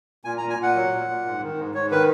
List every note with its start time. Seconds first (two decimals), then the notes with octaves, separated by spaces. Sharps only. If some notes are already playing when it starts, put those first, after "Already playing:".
0.25 A#2 G#5
0.38 A#5
0.42 A#2
0.50 G#5
0.58 A#2 F#5
0.75 F#3
0.92 A#2
1.08 A#2
1.25 G#2
1.42 D#3
1.58 G#2
1.75 G#2 C#5
1.91 D#3 B4